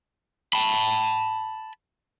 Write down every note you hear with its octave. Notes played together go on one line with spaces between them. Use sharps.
A5 B5